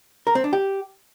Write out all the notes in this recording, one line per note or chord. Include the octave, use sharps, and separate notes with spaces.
A#4
C4
D4
G4